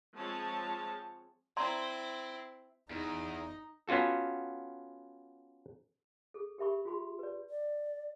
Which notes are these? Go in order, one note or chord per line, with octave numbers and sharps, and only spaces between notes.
F3 G#3 C4 C#5 A5
C4 E4 D5 A#5 C6
E2 D#4
B3 C#4 F4 F#4 A4
G#4 A4
G4 A#4 E5 B5 C#6
F4 F#4 G#4 B5 C6
B4 D5
D5